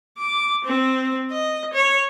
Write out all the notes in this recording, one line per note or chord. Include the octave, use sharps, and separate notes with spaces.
D6
C4
D#5
C#5